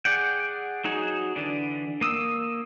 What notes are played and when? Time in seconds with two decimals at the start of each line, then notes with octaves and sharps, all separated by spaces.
0.05 G#4 D5 F#5 G5
0.84 F#3 D#4 F#4 G#4
1.36 D3 E3 D4
2.01 A#3 D#6 E6